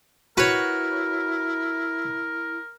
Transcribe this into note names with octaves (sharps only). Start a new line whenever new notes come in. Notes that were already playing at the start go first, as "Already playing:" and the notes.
E4 F#4 A#4 B4 C#5